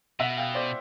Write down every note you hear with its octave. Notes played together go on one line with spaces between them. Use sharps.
B2 E5 F#5
F5 G5
C5 D5